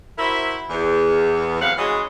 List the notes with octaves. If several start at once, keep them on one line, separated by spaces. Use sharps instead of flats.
E4 F#4 A#4 C5 E5
E2
A2 F#3 C4 F5 F#5
E3 G#3 C#4 F#4 D#5